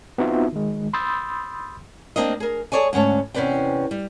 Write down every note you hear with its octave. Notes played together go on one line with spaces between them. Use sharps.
B3 C4 D#4 F4 F#4 E5
D#3 G#3
B5 C6 D#6 E6 G6 A6
A#3 C4 D4 A#4 D#5
G#4 A#4
G#4 A4 C#5 D5 G#5
D2 G#2 C#4 C#5 A5
E2 C3 C#4 B4 D5 G5
G3